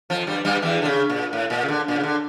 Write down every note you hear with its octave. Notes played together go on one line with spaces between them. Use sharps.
F2 F3
G2 G3
G2 G3
E2 E3
D3
C#3
A#2
A2
A#2
C#3
D3
A#2
C#3
D3